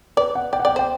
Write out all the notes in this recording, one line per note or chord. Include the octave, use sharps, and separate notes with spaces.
B4 D5
F#5
D5 G5
F#5
D5 G5
C5 G5